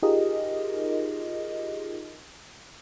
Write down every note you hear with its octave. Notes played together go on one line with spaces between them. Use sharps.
D#4 F4 G4 G#4 A#4 D#5